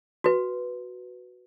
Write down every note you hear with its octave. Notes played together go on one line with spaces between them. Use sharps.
F#4 B4